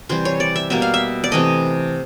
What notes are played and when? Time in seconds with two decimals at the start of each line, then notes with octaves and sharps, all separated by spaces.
0.09 C3 E3 G3 C5
0.25 C#5
0.40 D5
0.56 E5
0.70 B2 G3 A#3 E5
0.82 F5
0.94 E5
1.24 D5
1.32 C3 E3 A3 D#5